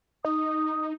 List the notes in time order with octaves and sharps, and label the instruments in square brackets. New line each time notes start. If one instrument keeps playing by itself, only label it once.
[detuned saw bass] D#4 [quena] D#6